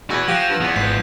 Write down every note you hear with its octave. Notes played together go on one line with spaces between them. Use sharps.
E2 F#4 B4 C#6 E6 G#6
F3 G4 F5 F#5 F#6 A#6 D7
G2
E2 F3 B3
G#1 G#2 G6 B6 C7